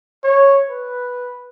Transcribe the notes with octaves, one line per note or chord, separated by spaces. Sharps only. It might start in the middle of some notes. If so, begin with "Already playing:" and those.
C#5
B4